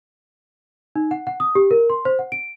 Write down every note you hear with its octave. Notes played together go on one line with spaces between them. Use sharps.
D#4
F#5
F#5
D#6
G4
A#4
C6
C5
F#5
D7